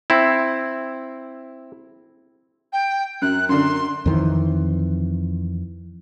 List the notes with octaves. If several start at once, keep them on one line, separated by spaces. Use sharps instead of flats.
C4 E4
G5
F#2 F#6
F#2 D3 C6
F2 D#3 E3